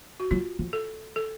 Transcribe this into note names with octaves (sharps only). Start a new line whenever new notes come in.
F#4
F#3 F4
F3
A4
A4